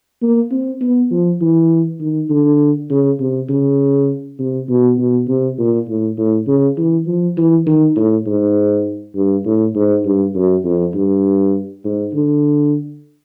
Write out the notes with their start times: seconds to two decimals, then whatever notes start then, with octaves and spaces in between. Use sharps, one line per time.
0.22 A#3
0.51 C4
0.81 B3
1.11 F3
1.41 E3
2.00 D#3
2.30 D3
2.90 C#3
3.20 C3
3.49 C#3
4.39 C3
4.69 B2
4.98 B2
5.28 C3
5.59 A#2
5.88 A2
6.18 A2
6.47 C#3
6.77 E3
7.07 F3
7.37 E3
7.66 D#3
7.96 A2
8.26 G#2
9.15 G2
9.46 A2
9.75 G#2
10.05 G2
10.35 F#2
10.64 F2
10.94 G2
11.84 G#2
12.13 D3